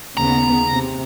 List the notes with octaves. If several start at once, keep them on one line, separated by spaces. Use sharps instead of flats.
D#2 C#3 B3 A#5
C3